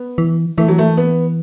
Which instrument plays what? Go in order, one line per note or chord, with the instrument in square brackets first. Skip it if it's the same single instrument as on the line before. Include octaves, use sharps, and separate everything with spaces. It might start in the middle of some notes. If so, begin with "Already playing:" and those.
Already playing: [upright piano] B3
[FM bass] E3
[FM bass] E3 [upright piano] A3
[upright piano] F#3
A3
B3